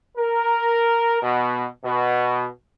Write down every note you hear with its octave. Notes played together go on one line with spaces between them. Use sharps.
A#4
B2
B2